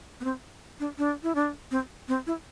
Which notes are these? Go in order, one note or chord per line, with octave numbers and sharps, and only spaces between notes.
B3
C4
D4
D4
E4
D4
C4
C4
E4